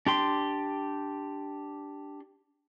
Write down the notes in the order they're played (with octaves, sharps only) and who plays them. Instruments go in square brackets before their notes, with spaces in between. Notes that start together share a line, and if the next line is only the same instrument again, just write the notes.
[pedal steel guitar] D4 G4 C6